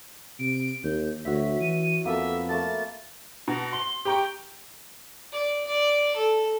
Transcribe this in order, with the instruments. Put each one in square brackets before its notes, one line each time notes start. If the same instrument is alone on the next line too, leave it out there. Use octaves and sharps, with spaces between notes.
[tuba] C3 [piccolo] D7
[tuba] D#2 [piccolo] G6
[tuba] D2 [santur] F#4 C#5 E5 [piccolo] B6
[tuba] E3 [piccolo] D#7
[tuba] F2 [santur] A#3 B3 A4 [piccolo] E5
[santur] A3 A#3 A5 [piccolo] A6
[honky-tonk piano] B2 [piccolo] A#5
[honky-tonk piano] C6 [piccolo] G7
[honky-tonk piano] G4 A#5 C#6 [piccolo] G5
[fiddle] D5
D5
A4